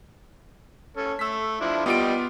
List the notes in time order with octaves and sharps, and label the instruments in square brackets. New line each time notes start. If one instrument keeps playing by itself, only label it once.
[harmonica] C#4 A4
[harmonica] A3 [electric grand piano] E6 B6
[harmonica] F3 D4 E4
[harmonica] G3 G4 D#5 [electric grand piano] B3 F4 D7